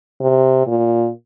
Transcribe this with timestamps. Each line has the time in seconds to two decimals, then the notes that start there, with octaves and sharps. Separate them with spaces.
0.21 C3
0.67 A#2